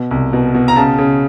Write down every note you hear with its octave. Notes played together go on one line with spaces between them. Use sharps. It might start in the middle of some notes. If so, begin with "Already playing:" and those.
Already playing: B2
C2
B2
B2
A#5
C#3 A5
C#3